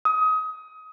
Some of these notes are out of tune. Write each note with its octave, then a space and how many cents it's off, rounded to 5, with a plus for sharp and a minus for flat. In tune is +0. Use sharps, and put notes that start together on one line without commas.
D#6 +25